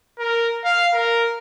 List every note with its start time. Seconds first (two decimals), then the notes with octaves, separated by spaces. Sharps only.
0.19 A#4
0.64 F5
0.93 A#4